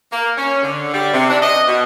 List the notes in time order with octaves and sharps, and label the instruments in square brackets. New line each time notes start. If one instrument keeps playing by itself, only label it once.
[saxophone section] A#3
C#4
D3
G3
C3
D4
D#5
B2